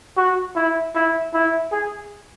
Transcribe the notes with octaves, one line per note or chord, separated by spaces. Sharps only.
F#4
E4
E4
E4
G#4